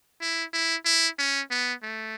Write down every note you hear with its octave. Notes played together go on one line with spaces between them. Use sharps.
E4
E4
E4
C#4
B3
A3